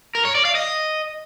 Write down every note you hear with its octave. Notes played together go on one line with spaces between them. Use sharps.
A#4
C#5
D5
F5
D#5